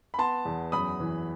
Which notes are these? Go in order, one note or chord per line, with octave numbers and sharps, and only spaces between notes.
B5
B3 A5 C6
E2
F#2 B5 D#6
E3